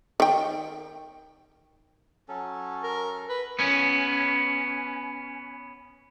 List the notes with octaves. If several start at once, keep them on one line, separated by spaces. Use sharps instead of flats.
D#3 G5
F#3 C#4 A4
A#4
B4
B3 C#4